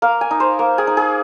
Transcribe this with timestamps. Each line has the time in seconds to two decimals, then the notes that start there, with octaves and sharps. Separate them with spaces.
0.02 A#3 F5
0.21 G#5
0.31 D#4
0.40 C5
0.59 A#3
0.78 G#4
0.87 D#4
0.97 G#4